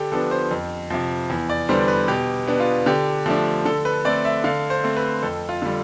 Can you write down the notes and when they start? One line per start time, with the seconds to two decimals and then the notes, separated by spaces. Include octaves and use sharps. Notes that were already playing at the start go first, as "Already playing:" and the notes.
Already playing: D3 G4 A4
0.12 F3 B3 D4 A4
0.31 C5
0.51 F2
0.90 C3 F3
1.30 E2
1.49 D5
1.69 D3 G3 B3 D4 C5
1.88 B4
2.08 B2 G4
2.48 B3 D4
2.60 F4
2.86 D3 G4
3.26 F3 A3 D4
3.66 D3 A4
3.85 B4
4.05 A3 C4 D5
4.25 E5
4.44 D3 F5
4.70 C5
4.84 A3 C4
4.96 B4
5.22 F2 A4
5.49 F4
5.62 D3 G3